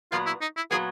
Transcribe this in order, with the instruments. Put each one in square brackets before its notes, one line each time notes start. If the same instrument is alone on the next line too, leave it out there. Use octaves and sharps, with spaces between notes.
[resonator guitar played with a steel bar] A#2 F#3 B3 [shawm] F4
[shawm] E4
D#4
E4
[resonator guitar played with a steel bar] A#2 F#3 B3 [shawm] G#4